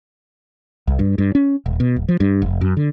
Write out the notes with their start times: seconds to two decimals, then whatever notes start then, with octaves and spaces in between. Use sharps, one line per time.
0.87 C2
0.99 G2
1.18 G2
1.35 C#4
1.66 D#1
1.80 B2
1.96 D1
2.08 F3
2.20 G2
2.42 F1
2.61 F#2
2.77 D3